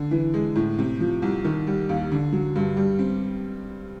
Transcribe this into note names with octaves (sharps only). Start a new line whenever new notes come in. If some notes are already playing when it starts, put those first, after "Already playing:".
Already playing: D3
E3
G#3
A2
C3
F3
C2
D#3
G3
D#2
D3
F#3
G2
G3
C4